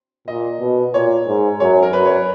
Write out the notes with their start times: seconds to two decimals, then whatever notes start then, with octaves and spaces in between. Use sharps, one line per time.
0.28 A#2 D#5
0.60 B2
0.94 A#2 C#5
1.27 G#2
1.60 F#2 C#5
1.83 A#4
1.93 F#2 B4
2.06 C#5
2.15 B4